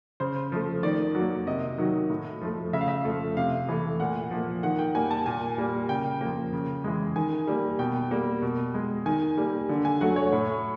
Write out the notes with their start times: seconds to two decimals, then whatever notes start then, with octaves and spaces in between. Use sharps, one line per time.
0.20 C#3 C5
0.52 F3 A3
0.83 D#3 D5
1.15 F#3 A#3
1.47 C3 D#5
1.78 D#3 F#3
2.10 A2
2.41 F3 A3
2.73 C#3 E5
2.81 F5
2.88 E5
3.05 F3 A3
3.37 C3 F5
3.68 E3 A3
4.00 A#2 F#5
4.31 F3 A#3
4.63 D#3 F#5
4.79 G5
4.95 G3 A#3 G#5
5.11 A5
5.26 A#2 G#5
5.58 G3 A#3
5.89 C#3 G5
6.21 F3 A#3
6.53 C#3
6.84 E3 G#3
7.16 D#3 G#5
7.47 G3 A#3
7.79 B2 G5
8.11 G3 A#3
8.42 B2
8.74 G#3
9.06 D#3 G#5
9.37 G3 A#3
9.69 D3
9.85 G#5
10.01 F#3 A3 F#5
10.16 C#5
10.32 A2